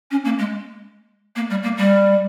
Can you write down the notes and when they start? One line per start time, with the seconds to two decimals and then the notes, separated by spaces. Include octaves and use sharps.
0.11 C#4
0.25 A#3
0.39 G#3
1.36 A#3
1.50 G3
1.63 A#3
1.77 G3